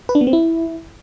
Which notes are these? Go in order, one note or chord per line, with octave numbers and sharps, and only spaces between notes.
B4
D4
B3
C4
E4